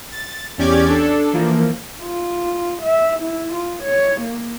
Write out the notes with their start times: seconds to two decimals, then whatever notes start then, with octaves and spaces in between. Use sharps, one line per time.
0.12 A6
0.58 E2 C#4 G4 D5 D6 G#6
0.88 D4 A4
1.33 E3 F3 A#3
2.03 F4
2.83 E5
3.20 E4
3.54 F4
3.83 C#5
4.21 A#3